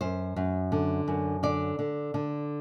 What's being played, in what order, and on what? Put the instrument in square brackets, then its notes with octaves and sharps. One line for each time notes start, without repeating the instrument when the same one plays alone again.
[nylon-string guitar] F#2 C5
F#2
D3
F#2
D3 D5
D3
D3